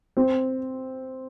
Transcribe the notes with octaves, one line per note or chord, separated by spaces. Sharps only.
C4